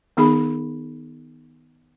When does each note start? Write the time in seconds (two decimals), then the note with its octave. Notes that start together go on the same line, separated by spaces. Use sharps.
0.17 D#3 B3 D#4 G#4 B5